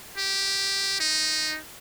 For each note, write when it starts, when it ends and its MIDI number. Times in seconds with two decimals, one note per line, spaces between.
0.18 1.00 67
1.01 1.59 63